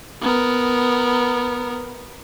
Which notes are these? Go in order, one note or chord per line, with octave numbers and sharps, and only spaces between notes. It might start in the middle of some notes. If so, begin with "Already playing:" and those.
B3 A#4